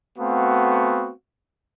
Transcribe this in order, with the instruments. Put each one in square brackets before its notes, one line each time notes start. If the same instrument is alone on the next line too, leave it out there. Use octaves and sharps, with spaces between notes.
[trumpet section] A3 B3 C4 F#4 F5